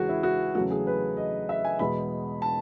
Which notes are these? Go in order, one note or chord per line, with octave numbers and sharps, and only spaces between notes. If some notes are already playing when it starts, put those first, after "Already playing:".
Already playing: E2 C#3 E3 G#3 F#4 G#4
E4
F#4
E2 C#3 F#3 A3 F#4
G#4
B4
D#5
E5
G#5
E2 B2 G#3 B5
A5